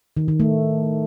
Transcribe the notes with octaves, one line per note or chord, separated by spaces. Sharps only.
D#3
D#3
A3